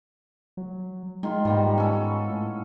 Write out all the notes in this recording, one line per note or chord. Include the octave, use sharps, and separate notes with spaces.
F#3
D#3 G#3 F4
G#2 G3 A#3 B3
C#4 A4
A2